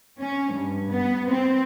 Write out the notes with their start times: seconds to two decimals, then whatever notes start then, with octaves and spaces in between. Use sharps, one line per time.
0.20 C#4
0.53 G2
0.90 B3
1.28 C4